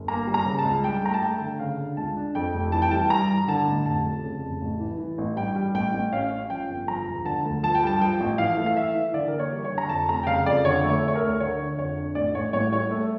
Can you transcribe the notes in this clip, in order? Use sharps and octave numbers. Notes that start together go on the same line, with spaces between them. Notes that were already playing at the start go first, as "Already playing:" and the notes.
Already playing: G1
A#3 A#5
G3
A#5
C#3
A5
C#2
G2 G5
A3 A#5
A5
A3 G5
D3
C#3 F5
D4
C#2 A5
D4
F2 G5
F1
E3 A5
G5
G3 A5
G2 A#5
G2
D3 A5
A1
F1 A5
F2
C#3
F1
A1
E3
E3
A1
G2 G5
G3
A1 G5
A1
C#4 F5
C#4
F3 G5
G1
F3 A#5
E1
D3 A5
D2
F3 A5
G5
G2 A5
F3 G5
A1
E3 F5
A3
F5
E3 E5
E3
D3 D5
A#4
A#3
C#5
G3
C#5
D3
A#5
F2 A5
F1 A#5
G5
C#3 F5
F2 D5
D3 C#5
A3
C#5
A3
C#5
A#4
D2
D3 C#5
D4
F2 C#5
D4
A1 D5
A1 C#5
A2 C#5
G3 C#5
A3